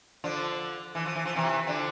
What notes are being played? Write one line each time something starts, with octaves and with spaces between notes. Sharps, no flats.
D3 F3
E3
F3
E3
F3
C3 E3
D3 F3